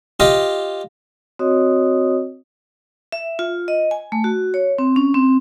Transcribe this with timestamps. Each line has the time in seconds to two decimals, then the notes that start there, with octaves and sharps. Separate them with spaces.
0.20 F4 G4 D#5
1.39 C4 F#4 C#5 D#5 D#6
3.12 E5
3.39 F4
3.68 D#5
3.91 G#5
4.12 A3
4.24 F#4
4.54 C#5
4.79 C4
4.96 C#4
5.14 C4